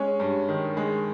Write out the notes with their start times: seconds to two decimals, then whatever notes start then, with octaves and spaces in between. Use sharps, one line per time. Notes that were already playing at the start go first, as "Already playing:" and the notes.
Already playing: G#3 C#4
0.20 G2
0.48 D#3
0.77 G#3